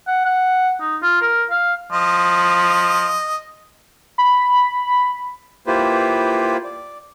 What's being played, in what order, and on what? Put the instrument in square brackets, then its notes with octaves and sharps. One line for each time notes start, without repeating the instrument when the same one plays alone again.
[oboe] F#5
F#5
D#4
F4
A#4
F5
[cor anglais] F3 [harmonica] D#5
[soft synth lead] B5
[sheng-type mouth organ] A#3 E4 F4 G4 B4 C5
D5